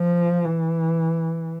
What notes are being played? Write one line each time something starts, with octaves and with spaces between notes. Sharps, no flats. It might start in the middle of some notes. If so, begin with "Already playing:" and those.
Already playing: F3
E3